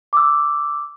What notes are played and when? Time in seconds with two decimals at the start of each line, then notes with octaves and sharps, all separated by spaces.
0.13 D6 E6